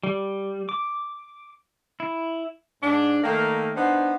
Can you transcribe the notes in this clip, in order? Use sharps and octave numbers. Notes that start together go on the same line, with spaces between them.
G3
D6
E4
G#2 D4
D#3 A3 A#3
B3 D4 D#4 C5